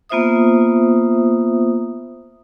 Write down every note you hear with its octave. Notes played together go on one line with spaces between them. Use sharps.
A#3 B3 F4 C5 E5 D#6